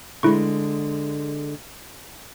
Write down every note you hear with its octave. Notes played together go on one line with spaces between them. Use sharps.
D3 G#3 E4 C#6